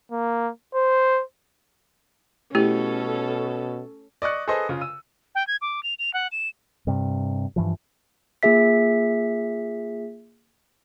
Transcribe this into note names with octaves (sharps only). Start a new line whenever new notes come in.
A#3
C5
B2 A3 C#4 E4 G4 A4
D5 D#5 C#6 F#6 C#7
G#4 A4 B4 C5 D#5
C#3 F4
E6 D#7
G5
G#6
D6
F7
F7
F#5
E7
G2 C3
G2 E3 F3
A#3 F4 G#4 E5 B6